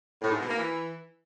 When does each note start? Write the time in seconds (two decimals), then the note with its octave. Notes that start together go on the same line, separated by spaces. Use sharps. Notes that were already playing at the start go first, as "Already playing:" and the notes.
0.22 A2
0.31 G#2
0.40 B2
0.49 A#3
0.58 E3